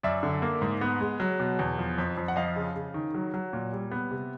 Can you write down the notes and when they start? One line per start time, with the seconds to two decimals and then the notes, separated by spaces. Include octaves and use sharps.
0.03 F#2 D5 E5
0.23 D3
0.42 A#3
0.62 G#2
0.81 B3
1.01 G#3
1.20 F#3
1.40 B2
1.59 E2
1.78 F3
1.98 F2
2.17 F2
2.28 F#5
2.36 F3 D#5 F5
2.56 C#3
2.76 C#3
2.94 D#3
3.14 F#3
3.34 F#3
3.53 A#2
3.73 G3
3.91 B3
4.11 C3